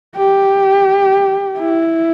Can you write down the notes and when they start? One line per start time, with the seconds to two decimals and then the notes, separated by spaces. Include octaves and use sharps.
0.17 G4
1.58 E4